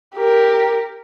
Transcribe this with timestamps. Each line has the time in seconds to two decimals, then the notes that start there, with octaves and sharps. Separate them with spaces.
0.16 G4 A#4